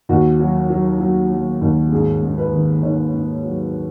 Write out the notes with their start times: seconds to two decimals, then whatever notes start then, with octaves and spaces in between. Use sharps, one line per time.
0.09 D#2 F#4
0.40 F#3
0.70 F#3
1.00 F#3
1.31 F#3
1.61 D#2
1.92 G#2 G#4
2.23 G#2
2.38 B4
2.53 D#3
2.83 D#3 C#5
3.14 G#2
3.44 F#3